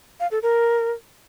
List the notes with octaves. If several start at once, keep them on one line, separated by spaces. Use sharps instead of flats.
F5
A4
A#4